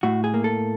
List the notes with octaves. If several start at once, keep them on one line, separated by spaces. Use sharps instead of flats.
A2 F#4
G#4
A#3
A4